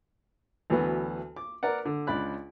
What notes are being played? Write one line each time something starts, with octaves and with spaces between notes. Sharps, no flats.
D2 E3 F#3 B3
D6
A#4 B4 D5 F#5
D3
C#2 D4 D5 B5 F#6